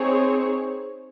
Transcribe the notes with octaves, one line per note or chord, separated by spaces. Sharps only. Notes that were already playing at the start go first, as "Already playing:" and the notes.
Already playing: C4 D#4 G#4 C#5